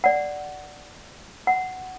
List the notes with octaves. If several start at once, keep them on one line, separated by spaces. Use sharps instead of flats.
D5 F#5
F#5